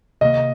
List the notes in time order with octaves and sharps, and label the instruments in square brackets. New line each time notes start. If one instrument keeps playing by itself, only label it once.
[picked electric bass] C3 D#3 A#3 [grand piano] D#5